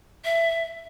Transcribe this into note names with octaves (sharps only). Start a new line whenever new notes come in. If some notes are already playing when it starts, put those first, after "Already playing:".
E5